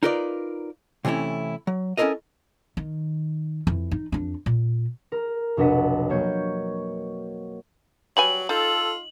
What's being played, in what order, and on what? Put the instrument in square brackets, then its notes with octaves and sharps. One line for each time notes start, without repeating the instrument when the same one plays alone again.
[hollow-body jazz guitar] D#4 F4 A#4 B4 D5
C3 E3 A3 C#4 E4
F#3
C#4 E4 F4 A4 A#4 D#5
[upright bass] D#3
F2 E3
D#4
F2 D4
A#2
[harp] A#4
F1 B1 D4 D#5 F#5 B6
F#3 A#3 C#5 G6
[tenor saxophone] F#3 [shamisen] G3 B4 G#5 [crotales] F#7
[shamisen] D#4 [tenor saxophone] F4 [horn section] A4